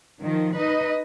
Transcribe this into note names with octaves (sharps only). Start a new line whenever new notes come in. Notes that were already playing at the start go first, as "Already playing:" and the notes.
D#3 F3
D#4 B4 D#5